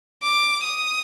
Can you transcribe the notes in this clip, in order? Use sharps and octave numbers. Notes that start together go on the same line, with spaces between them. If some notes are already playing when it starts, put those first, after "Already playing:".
D6
D#6